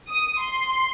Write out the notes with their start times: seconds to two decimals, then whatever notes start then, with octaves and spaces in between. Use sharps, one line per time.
0.08 D#6
0.41 C6